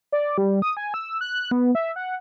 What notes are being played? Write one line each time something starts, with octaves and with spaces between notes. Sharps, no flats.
D5
G3
D#6
G#5
E6
F#6
B3
E5
F#5